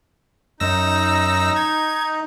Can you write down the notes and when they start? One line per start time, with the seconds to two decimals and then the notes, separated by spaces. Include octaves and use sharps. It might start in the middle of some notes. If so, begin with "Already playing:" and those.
0.60 F#2 D#4 E6 A#6
1.56 G#6